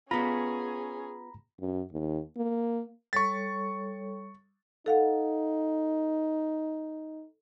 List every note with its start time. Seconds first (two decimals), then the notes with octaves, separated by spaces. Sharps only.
0.11 B3 C#4 F4 G#4 A#5 B5 A#6
1.60 F#2
1.92 D#2
2.37 A#3
3.13 G3 A4 C#5 C#6 A6
4.86 D#4 A4 F5 F#5